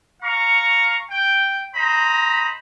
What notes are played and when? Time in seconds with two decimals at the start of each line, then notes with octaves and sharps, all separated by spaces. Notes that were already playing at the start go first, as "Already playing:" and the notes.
0.22 F5 A#5 C#6
1.10 G5
1.74 C5 D#5 A#5 B5